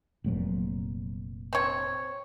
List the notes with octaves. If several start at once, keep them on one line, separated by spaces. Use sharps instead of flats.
F1 A#2 F#3
C4 C#5